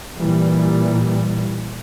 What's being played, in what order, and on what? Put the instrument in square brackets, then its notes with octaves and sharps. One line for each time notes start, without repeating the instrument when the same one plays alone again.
[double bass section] A#2 E3 G3